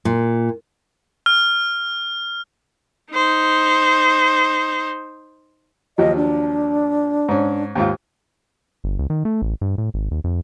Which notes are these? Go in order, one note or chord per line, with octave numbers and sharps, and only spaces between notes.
A#2
F6
D#4 C5
D#2 F3 F#3 D#5
D4
G#2 C#4
D#2 G#2 F4
G1
C#2
D#3
A3
A1
G2
A2
G#1
D#2
F2